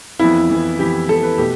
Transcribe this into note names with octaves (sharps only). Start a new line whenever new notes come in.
F2 E3 B3 E4
F2 E3 B3
F2 E3 B3 G4
F2 E3 B3 A4
B4
B2 A3 G4